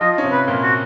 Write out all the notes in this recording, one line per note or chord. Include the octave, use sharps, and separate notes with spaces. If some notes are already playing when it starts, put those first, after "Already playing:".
F3 F4 D#5
C#4
C3 C4
B4
A#2 A#3
F#4